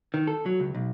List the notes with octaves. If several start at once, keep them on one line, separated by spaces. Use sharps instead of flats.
D#3
A4
F#3
C#2
B1